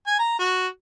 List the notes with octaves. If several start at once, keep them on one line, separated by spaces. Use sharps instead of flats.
G#5
A#5
F#4